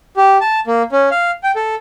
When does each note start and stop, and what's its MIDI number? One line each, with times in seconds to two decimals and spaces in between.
0.17 0.38 67
0.41 0.60 81
0.67 0.82 58
0.92 1.09 61
1.11 1.31 77
1.43 1.51 79
1.56 1.75 69